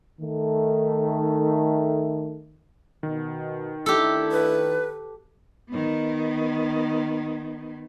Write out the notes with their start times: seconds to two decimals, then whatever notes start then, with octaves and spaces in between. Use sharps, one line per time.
0.21 D#3 A3
3.03 B2 D#3
3.86 A3 D4 E4 G4 A4
4.32 B4
5.70 D#3 B3